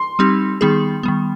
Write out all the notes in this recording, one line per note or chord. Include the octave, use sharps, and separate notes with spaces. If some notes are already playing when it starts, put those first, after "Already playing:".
Already playing: C6
G3 C4 D#4 G4
D#3 G3 B3 D#4 G#4
D#3 G3 B3